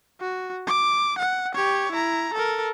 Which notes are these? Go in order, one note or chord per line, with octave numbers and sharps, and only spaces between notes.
F#4
D6
F#5
G4 C#5
E4 A#5
A4 A#4